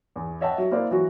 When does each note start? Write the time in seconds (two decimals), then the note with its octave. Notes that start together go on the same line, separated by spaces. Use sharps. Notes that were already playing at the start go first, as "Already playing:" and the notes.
0.16 E2
0.41 C#5 D#5 E5 F#5 G5 A5
0.58 F#3
0.71 A#3 E4 C5 D5 F5
0.91 E3 F#3 F#4